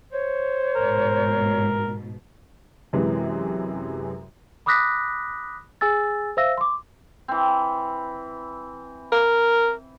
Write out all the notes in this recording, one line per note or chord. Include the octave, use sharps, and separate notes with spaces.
C5 C#5
A1 G#2 B2 A#4
F#2 C3 E3 G#3
B5 D6 D#6 F#6 A#6 B6
G#4 G#5 E6 A6
C5 E5 F5 E6 A#6
C6 D6
E3 C4
A#4